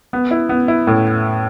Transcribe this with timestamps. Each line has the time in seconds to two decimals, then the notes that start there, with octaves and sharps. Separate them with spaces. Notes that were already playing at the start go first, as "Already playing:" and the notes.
0.13 B3
0.31 E4
0.49 B3
0.68 E4
0.87 A2